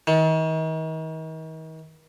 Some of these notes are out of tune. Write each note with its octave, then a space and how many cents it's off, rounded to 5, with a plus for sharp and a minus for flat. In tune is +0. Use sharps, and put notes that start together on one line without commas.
D#3 +40